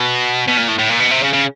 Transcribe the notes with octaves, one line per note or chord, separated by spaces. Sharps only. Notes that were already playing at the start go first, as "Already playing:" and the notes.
Already playing: B2
B2
A#2
A2
A2
A#2
B2
C3
C#3
C#3